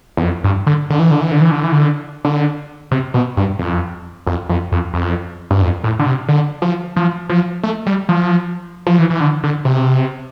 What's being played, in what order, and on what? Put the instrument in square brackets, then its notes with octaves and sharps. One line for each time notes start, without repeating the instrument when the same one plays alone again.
[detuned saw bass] E2
F2
G2
D3
D3
E3
D3
E3
D3
E3
D3
E3
D3
D3
C3
B2
G2
F2
F2
F2
F2
F2
G2
F2
A2
D3
C3
D3
F3
F3
F3
A3
G3
F3
F3
E3
E3
D3
D3
C3